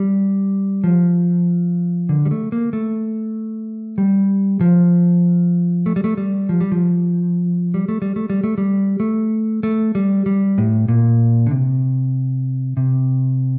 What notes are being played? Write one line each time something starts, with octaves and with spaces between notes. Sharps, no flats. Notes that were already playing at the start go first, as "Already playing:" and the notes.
Already playing: G3
F3
D3
G3
A3
A#3
A3
G3
F3
A3
G3
A3
G3
F3
G3
F3
G3
A3
G3
A3
G3
A3
G3
A3
A3
G3
G3
A2
A#2
D3
C3
C3